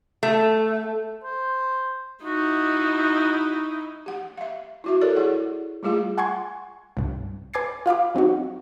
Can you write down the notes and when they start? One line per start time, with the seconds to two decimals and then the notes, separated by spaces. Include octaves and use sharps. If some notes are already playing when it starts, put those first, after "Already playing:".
0.23 A3
1.24 C5
2.24 D#4 E4 F#4
4.06 G4 F#5
4.37 E5 F5
4.84 E4 F#4 E5
5.01 G4 A4 A#4 C#5 D5
5.16 E4 G#4 F#5
5.83 G3 A3 F4 G#4 F5
6.18 F#5 G#5 C6 C#6 G#6
6.97 C2 G2
7.54 B4 G#5 D6 G#6 A6 C7
7.86 F4 F5 B5 D6
8.14 F#3 C4 D#4 F#4